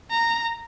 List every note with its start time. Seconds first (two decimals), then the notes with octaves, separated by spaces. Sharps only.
0.11 A#5